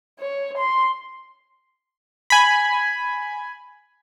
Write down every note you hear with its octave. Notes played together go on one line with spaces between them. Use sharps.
C#5
C6
G#5 B5